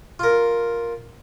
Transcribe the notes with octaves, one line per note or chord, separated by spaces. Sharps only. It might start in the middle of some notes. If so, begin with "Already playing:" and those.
F4 A#4